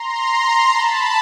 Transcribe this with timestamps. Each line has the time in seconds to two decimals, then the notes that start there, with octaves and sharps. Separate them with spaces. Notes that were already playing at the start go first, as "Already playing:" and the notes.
Already playing: A#5 C6
0.67 A5 B5